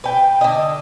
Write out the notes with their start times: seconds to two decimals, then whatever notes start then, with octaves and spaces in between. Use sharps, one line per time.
0.04 B4 G5
0.41 D3 D#5